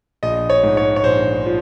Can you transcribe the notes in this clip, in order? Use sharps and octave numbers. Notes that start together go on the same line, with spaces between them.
A#1 D#5
C#5
G#2
C#5
C#5
A#1 C5
F3